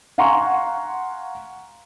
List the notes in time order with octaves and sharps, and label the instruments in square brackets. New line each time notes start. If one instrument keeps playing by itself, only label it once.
[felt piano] F5 F#5 G#5 A#5 C6 C#6